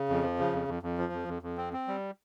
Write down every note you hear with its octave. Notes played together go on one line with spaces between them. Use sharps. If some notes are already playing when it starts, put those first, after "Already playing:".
Already playing: C#3
F2
F3
C#3
F2
F2
F2
F3
F2
F2
F2
C4
C4
G3